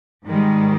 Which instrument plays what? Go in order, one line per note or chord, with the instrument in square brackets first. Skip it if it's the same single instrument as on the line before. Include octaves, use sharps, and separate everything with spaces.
[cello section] G#2 D#3 G3 G#3